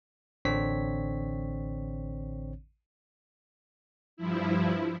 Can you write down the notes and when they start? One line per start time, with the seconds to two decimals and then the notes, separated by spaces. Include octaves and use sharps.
0.45 A1 D3 C4 D4 C#5 B6
4.17 G2 F3 E4